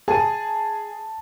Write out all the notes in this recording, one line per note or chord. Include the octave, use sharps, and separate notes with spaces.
G#4 A5 D#7